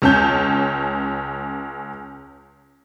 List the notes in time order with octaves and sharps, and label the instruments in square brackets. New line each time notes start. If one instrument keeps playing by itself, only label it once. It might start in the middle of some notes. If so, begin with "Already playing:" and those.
[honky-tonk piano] C#2 C#4 A5 G6